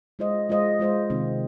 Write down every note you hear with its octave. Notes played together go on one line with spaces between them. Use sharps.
G#3 F4 C5 D#5
G#3 F4 C5 D#5
G#3 F4 C5 D#5
C3 D#3 C4